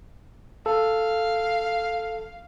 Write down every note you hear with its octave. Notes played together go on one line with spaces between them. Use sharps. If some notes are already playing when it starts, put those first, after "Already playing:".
A4 F5